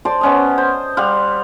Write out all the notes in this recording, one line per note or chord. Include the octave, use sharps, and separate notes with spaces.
C5 D5 A5 C6
B3 C#4 D#5
C5
G3 F5 F#5 C6